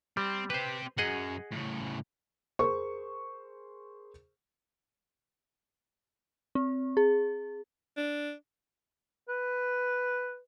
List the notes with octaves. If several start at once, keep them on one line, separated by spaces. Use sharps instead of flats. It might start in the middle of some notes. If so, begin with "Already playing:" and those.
G3 C4
C4 G4 B4 C5
F#2 G#4 D#5 F#5
A2 C#3
G#4 A#4 C5 C#6
C4
G#4
D4
B4